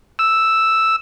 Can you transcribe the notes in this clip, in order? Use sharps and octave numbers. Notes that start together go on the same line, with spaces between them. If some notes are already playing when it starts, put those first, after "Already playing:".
E6